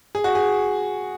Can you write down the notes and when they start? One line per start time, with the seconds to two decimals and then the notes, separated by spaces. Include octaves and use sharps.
0.15 G#4
0.24 F#4
0.35 G#4